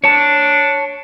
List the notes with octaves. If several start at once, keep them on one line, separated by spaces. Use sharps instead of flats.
D4 C#5 A5